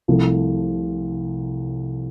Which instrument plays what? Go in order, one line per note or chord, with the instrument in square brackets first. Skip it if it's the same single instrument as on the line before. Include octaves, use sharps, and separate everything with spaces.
[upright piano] C2 C3 F3 A3